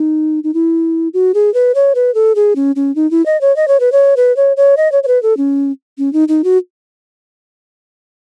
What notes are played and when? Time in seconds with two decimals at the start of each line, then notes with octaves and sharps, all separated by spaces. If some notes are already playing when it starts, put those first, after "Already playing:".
Already playing: D#4
0.44 D#4
0.54 E4
1.14 F#4
1.34 G#4
1.54 B4
1.75 C#5
1.95 B4
2.15 A4
2.35 G#4
2.56 C#4
2.76 C#4
2.96 D#4
3.11 E4
3.26 D#5
3.41 C#5
3.56 D#5
3.68 C#5
3.80 B4
3.92 C#5
4.17 B4
4.36 C#5
4.57 C#5
4.77 D#5
4.92 C#5
5.03 C#5
5.08 B4
5.23 A4
5.37 C#4
5.98 C#4
6.13 D#4
6.28 D#4
6.44 F#4